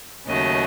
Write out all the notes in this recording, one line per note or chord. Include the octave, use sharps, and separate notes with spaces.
D#2 C#3 F#3 A3 D#5